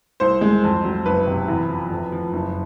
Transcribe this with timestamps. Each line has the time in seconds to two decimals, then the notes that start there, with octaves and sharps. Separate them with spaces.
0.20 C2 C5
0.41 G#3
0.64 F2
0.84 F#3
1.06 F#1 B4
1.27 C3
1.48 E2
1.69 F3
1.90 F2
2.12 F3
2.33 F#1